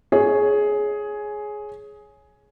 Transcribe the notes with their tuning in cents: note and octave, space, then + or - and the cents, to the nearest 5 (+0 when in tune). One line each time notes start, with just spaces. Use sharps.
G#4 +10 C#5 +0